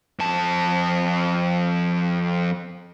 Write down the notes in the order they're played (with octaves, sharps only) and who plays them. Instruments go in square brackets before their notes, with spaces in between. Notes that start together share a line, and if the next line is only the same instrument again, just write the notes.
[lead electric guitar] F2 A5